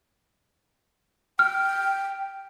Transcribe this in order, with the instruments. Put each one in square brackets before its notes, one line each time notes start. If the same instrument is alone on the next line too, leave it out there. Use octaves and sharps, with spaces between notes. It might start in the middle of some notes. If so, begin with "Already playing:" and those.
[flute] G5 [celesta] F6